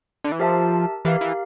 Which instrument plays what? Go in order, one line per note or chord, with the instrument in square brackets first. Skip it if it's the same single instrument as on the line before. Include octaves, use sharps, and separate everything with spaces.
[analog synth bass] D3
E3
[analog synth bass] F3 [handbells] G4 A#4 E5 A5
[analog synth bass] E3 [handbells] G4 A#4 F5
[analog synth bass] E3